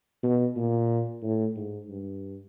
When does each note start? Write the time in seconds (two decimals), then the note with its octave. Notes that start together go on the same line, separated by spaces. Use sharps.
0.23 B2
0.56 A#2
1.23 A2
1.56 G#2
1.89 G2